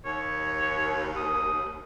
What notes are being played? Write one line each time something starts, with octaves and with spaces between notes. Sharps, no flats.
D#2 C#5
D#6